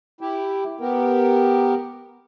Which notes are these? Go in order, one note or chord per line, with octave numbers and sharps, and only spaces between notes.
E4 G4
B3 G4 A#4